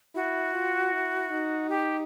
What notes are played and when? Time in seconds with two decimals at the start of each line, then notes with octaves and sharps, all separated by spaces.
0.15 E4 F#4
0.53 F4
0.93 E4
1.31 D#4
1.69 G4